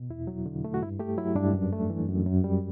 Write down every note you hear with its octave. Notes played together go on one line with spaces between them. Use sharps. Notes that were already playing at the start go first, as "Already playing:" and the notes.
Already playing: B2
E2 E4
F#3
D3
A3
F#4
G2 E4
A3 G4
F#3 E4
G2 D4
F#2
A3
E3
F#2
F#2
G3